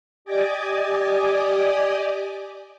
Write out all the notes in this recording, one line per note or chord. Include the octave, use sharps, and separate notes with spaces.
G4 D5 D#5 G#5 D6 D#6